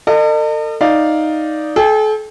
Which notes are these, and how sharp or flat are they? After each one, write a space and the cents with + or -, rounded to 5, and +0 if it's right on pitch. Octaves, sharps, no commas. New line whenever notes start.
A4 +45 D#5 -40
D#4 +0 D5 +0 F5 +0
A4 -40 G5 +25